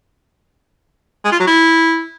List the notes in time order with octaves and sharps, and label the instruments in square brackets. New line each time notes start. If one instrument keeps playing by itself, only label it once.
[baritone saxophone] G#3
F4
F#3
E4